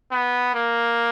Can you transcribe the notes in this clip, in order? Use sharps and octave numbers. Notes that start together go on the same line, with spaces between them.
B3
A#3